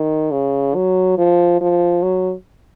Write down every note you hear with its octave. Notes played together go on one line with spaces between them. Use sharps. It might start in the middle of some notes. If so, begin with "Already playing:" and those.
Already playing: D#3
C#3
F#3
F3
F3
F#3